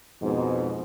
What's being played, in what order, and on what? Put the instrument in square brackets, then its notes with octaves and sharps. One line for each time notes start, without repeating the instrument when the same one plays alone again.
[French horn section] F2 G#2 B2